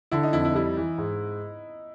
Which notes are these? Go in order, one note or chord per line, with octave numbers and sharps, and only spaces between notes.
D3 E4
D#4
F2 E4
E4
G3 E4
E3
G#2